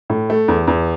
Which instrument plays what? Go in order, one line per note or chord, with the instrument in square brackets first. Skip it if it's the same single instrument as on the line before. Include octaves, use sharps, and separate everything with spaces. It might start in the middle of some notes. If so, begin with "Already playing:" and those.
[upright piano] A2
A3
E2
E2